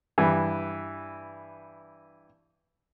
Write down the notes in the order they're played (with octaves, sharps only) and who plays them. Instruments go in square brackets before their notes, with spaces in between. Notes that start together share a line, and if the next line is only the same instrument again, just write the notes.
[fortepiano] G2 E3